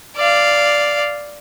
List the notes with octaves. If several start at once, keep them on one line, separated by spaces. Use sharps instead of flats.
D5 F5